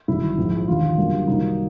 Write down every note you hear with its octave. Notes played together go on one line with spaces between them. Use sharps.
G1 F#2 D#3 E4
A#1 G#2 F3 G#3
E1 D#2 D3 F3 F4
F#2 D3 G3 A#3
C2 C3 D#3 F#3 A#3 D#4